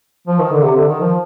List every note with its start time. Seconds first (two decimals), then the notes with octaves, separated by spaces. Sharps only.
0.27 F3
0.39 D#3
0.52 D3
0.63 C3
0.76 D3
0.88 D#3
1.01 F3